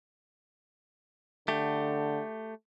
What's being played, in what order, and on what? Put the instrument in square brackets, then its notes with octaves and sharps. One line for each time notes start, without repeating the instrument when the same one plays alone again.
[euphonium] D3 [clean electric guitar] A3 G4